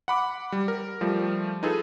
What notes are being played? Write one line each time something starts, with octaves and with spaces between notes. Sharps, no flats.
F#5 B5 D6
G3
A#4
F3 G3 A3
D#4 F4 G#4 A4 B4